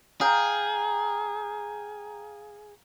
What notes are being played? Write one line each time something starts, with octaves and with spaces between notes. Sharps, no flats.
G#4 F5 G5 A#5